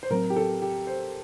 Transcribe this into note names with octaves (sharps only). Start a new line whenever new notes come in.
C5
A2 F#3 C4 A#4
G4
A4
G4
C5